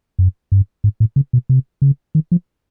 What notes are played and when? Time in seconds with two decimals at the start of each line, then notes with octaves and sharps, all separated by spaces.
0.19 F#2
0.52 G2
0.84 G#2
1.00 A2
1.16 C#3
1.33 B2
1.49 C3
1.82 C#3
2.15 D#3
2.32 F3